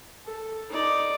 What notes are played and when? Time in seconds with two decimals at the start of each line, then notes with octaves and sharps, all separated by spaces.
0.25 A4
0.69 D#4 D5